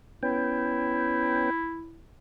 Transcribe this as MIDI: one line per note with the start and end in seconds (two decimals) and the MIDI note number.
0.23 1.50 59
0.23 1.50 61
0.23 2.01 64
0.23 1.50 79